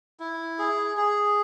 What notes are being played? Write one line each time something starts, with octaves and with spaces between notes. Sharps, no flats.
E4
G#4
G#4